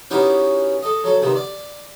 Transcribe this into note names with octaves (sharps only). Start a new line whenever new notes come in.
B3 C#4 D#4 E4 F#4 G4
A4 D#5
F#3 A4
C3 D#3 B3
D5